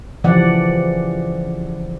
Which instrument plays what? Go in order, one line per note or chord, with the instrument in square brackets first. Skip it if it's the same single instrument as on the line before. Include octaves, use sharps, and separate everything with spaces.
[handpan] C#3 E3 F3 G3 D5 F#5